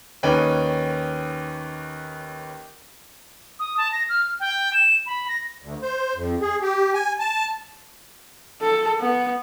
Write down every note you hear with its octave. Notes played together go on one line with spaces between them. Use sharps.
D#2 C#4 D#4 B4 G5
D#6
A5
A#6
F6
G5
E7
B5
A#6
D2
C5
F2
G#4
G4
G#5
A5
A4
B3